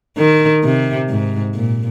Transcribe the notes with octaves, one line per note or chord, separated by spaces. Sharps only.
D#3
C3
G#2
A#2